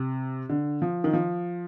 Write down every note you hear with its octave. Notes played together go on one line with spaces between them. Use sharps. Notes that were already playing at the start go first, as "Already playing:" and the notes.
Already playing: C3
D3
F3
D#3
F3